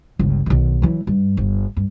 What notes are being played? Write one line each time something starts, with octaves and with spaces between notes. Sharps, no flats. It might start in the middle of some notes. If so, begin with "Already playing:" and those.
G1 C#2
B1 D#3
E3 F#3
G2
G1
G2